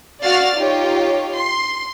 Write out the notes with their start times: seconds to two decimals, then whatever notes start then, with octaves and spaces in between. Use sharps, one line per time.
0.23 F#4 D5 F5 F#5 F6 A6
0.57 D#4 F4 G4 C#5
1.36 C6